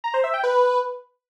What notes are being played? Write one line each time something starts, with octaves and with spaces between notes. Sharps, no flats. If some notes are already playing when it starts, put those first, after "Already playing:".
A#5
C5
E5
G5
B4